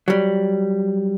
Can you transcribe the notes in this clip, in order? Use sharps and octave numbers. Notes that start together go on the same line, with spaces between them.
F#3 G3